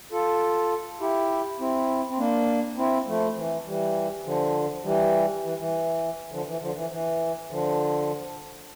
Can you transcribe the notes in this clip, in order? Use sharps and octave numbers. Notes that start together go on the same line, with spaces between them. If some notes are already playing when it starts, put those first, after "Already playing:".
F4 A4
E4 G4
C4 E4
C4
A#3 D4
C4 E4
F3 A3
E3
E3 G3
D3 F3
E3 G3
E3
E3
D3 F3
E3
D3 F3
E3
E3
D3 F3